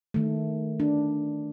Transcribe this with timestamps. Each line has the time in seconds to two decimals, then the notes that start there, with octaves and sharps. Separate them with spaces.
0.14 D#3 A3
0.80 D4